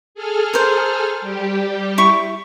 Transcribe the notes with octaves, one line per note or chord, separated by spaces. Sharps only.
G#4 A4 F6
A#4 C5
G3 G4
E4 C#6